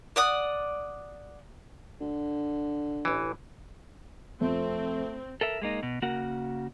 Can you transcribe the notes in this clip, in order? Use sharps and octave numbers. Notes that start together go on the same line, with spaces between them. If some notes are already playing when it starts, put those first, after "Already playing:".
D5 F#5 D#6
D3
A1 E3
F2 A3 C4
A4 A#4 E5
G#3 A#3 D#4
B2
C#3 A#3 F#4 A#4 F#5